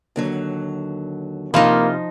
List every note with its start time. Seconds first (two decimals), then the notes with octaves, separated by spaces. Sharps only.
0.16 D#2 D3 F#3
1.54 C3 E3 F3 A#3 D#4 F4